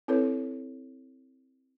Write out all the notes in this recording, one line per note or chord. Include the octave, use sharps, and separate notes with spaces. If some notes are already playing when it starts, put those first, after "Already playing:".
C4 E4 A4 B4 C#5